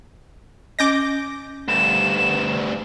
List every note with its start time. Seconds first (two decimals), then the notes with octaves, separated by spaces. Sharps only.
0.79 C#4 D#5 D6 G6 A#6
1.68 D2 G2 E7